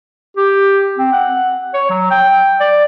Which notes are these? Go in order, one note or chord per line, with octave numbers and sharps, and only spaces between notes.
G4
C4
F#5
C#5
F#3
G5
D5